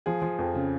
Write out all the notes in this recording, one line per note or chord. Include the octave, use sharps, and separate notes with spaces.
F3 G#4
F3
F2
C#3